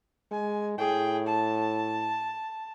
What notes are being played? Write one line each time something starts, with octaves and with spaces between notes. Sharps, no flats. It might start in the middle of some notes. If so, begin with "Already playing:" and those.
G#3 G#5
A2 G#4 G5
A5